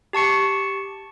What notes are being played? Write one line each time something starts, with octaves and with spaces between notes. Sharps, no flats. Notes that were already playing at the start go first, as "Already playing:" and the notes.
G4 A5 C#6 C#7